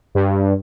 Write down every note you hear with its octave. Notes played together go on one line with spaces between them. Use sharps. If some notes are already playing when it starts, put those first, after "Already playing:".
G2